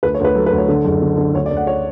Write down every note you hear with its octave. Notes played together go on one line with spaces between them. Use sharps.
D2 B4
C#5
D2 B4
F#3 A4
B4
D2
C#5
D3 A4
F#1
D3
D3
D2 C#5
D5
D2
F#5
C#5